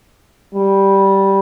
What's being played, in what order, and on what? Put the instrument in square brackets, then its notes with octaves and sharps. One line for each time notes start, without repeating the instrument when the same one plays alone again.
[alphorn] G3